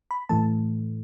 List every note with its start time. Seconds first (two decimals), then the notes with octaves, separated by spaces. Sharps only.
0.11 B5
0.29 A2 E3 A3 A5